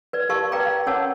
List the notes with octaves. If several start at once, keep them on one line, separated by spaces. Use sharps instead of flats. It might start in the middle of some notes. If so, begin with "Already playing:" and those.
B4 D5
G4 A#4 D5 F5 A5 C#6
B4 D5 F5 G5 A#5 D6
F5
C#4 A#4 C#5 F#5 A5 D6